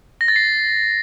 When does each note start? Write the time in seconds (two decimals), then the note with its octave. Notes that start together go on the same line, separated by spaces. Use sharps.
0.21 A#6
0.28 A6
0.36 C7